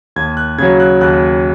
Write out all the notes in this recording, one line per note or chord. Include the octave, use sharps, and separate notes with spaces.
D#2 G#6
F#6
C#3 F#3 G#6
F#6
D#2 F#6